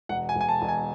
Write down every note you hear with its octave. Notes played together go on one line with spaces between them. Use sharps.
E1 F#5
G#5
E1
G#5
A5
E1
G#5